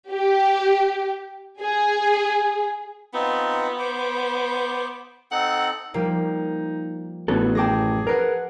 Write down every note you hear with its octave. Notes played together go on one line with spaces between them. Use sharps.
G4
G#4
B3 C4 D#4 F4
C5 D6
C4 D#4 A4 F#5
F3 G3 A#3 D#4
A1 B3 F#4 G#4 A4
F#2 G#4 G5 A5 D6 A#6
A#4 B4 F#5 C7 D7